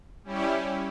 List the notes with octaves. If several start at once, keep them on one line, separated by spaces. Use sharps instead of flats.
G3 C#4 E4 G4